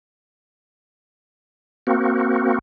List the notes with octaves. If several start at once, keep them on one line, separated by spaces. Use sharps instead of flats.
A#3 C4 F#4